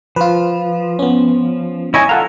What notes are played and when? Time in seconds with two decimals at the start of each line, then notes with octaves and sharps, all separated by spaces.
0.16 F3 F4 B4
0.99 B3 C#4
1.94 E4 C#5 D#5 G#5 C#6
2.09 F4 A4 F5 F#5 A5 A#5